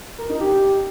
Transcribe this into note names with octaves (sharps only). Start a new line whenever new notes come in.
A#4
D#4
G4